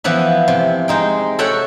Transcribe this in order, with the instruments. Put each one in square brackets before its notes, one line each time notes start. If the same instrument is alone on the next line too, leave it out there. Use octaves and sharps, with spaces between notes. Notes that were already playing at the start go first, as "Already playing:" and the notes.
[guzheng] E3 F3 B3 E5
C3
G#3 D#4 G5
A4 C#5 E5 F#5 G5